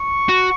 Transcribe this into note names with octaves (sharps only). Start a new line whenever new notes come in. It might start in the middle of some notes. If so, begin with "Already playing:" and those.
Already playing: C#6
F#4